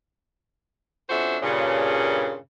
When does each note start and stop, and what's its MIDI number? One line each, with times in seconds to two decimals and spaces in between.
1.10 1.37 41
1.10 1.37 61
1.10 1.37 62
1.10 1.37 66
1.10 1.37 72
1.10 1.37 76
1.43 2.38 43
1.43 2.38 46
1.43 2.38 49